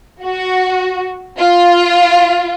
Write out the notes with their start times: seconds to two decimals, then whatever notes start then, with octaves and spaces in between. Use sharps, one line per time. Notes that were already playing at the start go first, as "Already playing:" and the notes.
0.23 F#4
1.38 F4